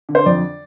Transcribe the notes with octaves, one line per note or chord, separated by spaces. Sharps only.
D3
C5
F2 D5